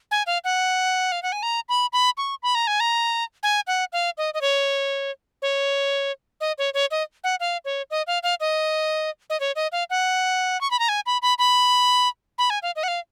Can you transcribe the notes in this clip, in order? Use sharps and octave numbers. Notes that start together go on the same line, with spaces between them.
G#5
F5
F#5
F5
F#5
G#5
A#5
B5
B5
C#6
B5
A#5
G#5
A#5
G#5
F#5
F5
D#5
D#5
C#5
C#5
D#5
C#5
C#5
D#5
F#5
F5
C#5
D#5
F5
F5
D#5
D#5
C#5
D#5
F5
F#5
C#6
B5
A#5
G#5
B5
B5
B5
B5
G#5
F5
D#5
F#5
F5